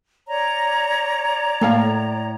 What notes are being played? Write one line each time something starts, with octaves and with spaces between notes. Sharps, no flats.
C#5 D5 A#5
A2 A#3 A4 F5